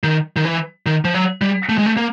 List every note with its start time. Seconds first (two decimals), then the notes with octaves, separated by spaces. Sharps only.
0.03 D#3
0.36 D#3
0.45 E3
0.86 D#3
1.05 F3
1.14 F#3
1.41 G3
1.69 A3
1.78 G#3
1.86 A3
1.97 A#3